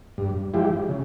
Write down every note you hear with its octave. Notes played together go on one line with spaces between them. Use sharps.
G2
F3 G#3 E4 G4
C#3